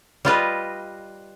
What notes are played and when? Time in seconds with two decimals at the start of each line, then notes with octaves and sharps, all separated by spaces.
0.25 G3 F4 B4 D#5